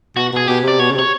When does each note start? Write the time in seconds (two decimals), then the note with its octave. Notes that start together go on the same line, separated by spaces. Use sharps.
0.16 B2 F#4
0.33 B2 G#4
0.48 B2 G4
0.63 C3 D5
0.79 B2 C#5
0.90 C#3
0.95 C3
0.99 C#5